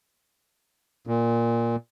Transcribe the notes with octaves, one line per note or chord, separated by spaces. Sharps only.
A#2